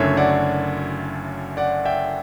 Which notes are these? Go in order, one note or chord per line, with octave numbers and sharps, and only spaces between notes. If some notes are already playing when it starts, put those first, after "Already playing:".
Already playing: F#1 F#2 D3 A3 C#5 E5
D5 F#5
D5 F#5
E5 G5